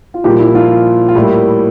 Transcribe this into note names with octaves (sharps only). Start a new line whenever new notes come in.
F4
A#2 F3 G3 A#3 G4
E4
F3 F4
F4
A2 G3 A#3 E4